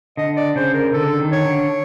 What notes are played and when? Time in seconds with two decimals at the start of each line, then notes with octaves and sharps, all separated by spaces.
0.17 D3 D#5
0.37 D5
0.56 C#3 C5
0.74 A#4
0.93 D3 A4
1.20 D#3
1.33 C#5
1.45 D3